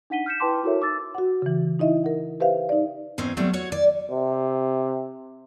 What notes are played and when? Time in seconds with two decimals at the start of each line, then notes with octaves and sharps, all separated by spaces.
0.10 D4 D#4 F#5 B6 D#7 G7
0.26 F6 G6 B6 C#7 E7
0.40 E4 B4 G5 A5 C6 D6
0.63 E4 F#4 A4 A#4 C#5 E5
0.81 D#4 D6 E6 A6
1.15 F#4 F#5
1.42 C#3 E3
1.79 D#4 E4 D#5 E5
2.04 A#4 F#5
2.40 G4 B4 C5 E5 F5
2.69 D#4 D5
3.18 E2 G#2 C4 C#4
3.37 F#3 G3 A3 C4
3.53 F#4 C#5
3.72 D5
4.11 C3